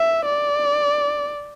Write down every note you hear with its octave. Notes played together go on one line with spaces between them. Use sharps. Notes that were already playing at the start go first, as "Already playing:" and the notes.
Already playing: E5
D5